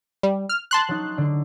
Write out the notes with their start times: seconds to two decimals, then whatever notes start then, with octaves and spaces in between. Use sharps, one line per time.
0.23 G3
0.49 F6
0.71 A5 C6 F#6
0.89 F#3 D#4
1.18 D3